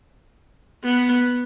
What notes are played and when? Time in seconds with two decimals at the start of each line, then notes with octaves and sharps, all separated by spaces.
0.84 B3